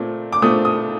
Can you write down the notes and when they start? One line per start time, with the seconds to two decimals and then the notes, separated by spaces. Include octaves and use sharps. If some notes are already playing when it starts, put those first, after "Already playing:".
Already playing: A#2 A3 C4
0.33 D6
0.42 A#2 A3 C4 D#6
0.65 D#6